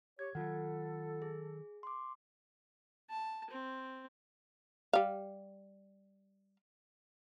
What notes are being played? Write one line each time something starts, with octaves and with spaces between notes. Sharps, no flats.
G4 C#5 G#6
D#3 F#3 F4 A4 F#5
G#4
C6 D6
A5
C4
G3 F5